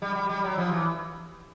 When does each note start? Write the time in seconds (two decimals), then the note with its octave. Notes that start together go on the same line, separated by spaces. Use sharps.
0.02 G3
0.15 G3
0.30 G3
0.44 F#3
0.58 F3
0.71 E3